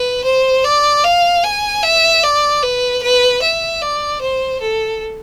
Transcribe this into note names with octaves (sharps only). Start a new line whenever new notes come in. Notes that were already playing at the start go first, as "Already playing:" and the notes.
Already playing: B4
C5
D5
F5
G#5
E5
D5
B4
B4
E5
D5
C5
A4